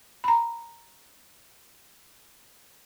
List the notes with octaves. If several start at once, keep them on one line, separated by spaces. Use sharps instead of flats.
A#5 B5